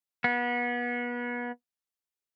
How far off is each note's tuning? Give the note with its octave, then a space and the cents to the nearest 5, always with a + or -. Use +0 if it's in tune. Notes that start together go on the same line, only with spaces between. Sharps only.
B3 -30